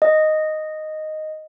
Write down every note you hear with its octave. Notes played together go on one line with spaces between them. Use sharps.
D#5